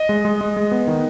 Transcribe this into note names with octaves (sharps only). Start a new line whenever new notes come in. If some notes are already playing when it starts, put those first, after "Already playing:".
Already playing: D#5
G#3
G#3
G#3
G#3
B3
D#3